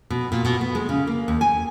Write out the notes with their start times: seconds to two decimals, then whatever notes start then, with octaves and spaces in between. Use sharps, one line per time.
0.10 B2
0.32 A#2
0.45 B2
0.61 B3
0.75 G#3
0.89 C#3
1.07 A#3
1.28 D#2
1.41 G#5